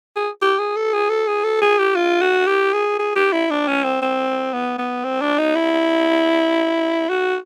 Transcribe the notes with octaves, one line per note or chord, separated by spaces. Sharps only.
G#4
G4
G#4
A4
G#4
A4
G#4
A4
G#4
G4
F4
F#4
G4
G#4
G#4
G4
E4
D4
C#4
C4
C4
B3
B3
C4
D4
D#4
E4
F#4